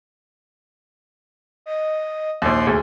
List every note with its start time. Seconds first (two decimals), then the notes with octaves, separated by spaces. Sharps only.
1.66 D#5
2.42 A#1 D#2 C6
2.67 D2 G#4